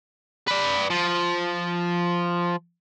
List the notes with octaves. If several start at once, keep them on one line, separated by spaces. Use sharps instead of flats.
B4 D5
F3